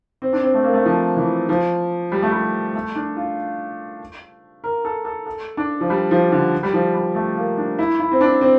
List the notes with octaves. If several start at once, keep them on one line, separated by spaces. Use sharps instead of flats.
C4
D4
C4
A3
A#3
A3
F3
E3
F3
G3
A3
G3
A3
D4
F4
A#4
A4
A4
A4
D4
F3
G3
F3
D3
G3
F3
G3
A3
A#3
D4
E4
E4
C4
D4
C4